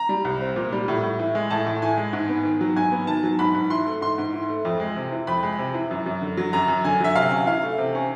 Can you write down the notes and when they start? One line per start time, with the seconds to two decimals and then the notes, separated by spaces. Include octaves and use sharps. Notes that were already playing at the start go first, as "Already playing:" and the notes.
Already playing: A#5
0.09 G3
0.25 C2
0.41 C4
0.56 A#2
0.72 G3
0.88 A2
1.03 A2
1.19 E3
1.35 G#3
1.50 A2 A5
1.66 A2
1.82 E3 G#5
1.98 G#3
2.13 G#2
2.29 B3
2.45 D#3
2.61 F#3
2.76 G#2 G#5
2.92 B3
3.07 D#3 A5
3.23 F#3
3.39 G#2 B5
3.55 G#2
3.70 E3 C6
3.86 A3
4.01 G#2 C6
4.18 G#2
4.33 E3
4.49 A3
4.65 F2
4.80 G#3
4.96 C3
5.12 E3
5.27 F2 B5
5.43 G#3
5.58 C3
5.74 E3
5.91 F#2
6.06 F#2
6.22 D3
6.37 F#3
6.53 F#2 A#5
6.68 F#2
6.84 D3 G#5
7.00 F#3 E5
7.16 C3 F5
7.32 C#4
7.47 E3 F5
7.63 A3
7.78 C3
7.95 C#4